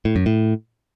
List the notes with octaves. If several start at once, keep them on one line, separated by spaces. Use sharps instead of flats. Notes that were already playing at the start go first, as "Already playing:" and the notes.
A2
F#2
A2